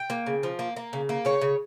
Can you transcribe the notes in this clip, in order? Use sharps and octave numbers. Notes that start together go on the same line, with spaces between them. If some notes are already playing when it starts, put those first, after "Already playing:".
Already playing: G5
A#3
C#3
F3
A#3
A#3
C#3
A#3
C#3 C#5
C#3